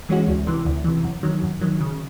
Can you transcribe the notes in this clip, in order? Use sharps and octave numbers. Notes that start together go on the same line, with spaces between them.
E3 G#3 C#4 F#4
D2
C3 E3
D2
C3 E3
F#2
D#3 F#3
F#2
D#3 F#3
C#3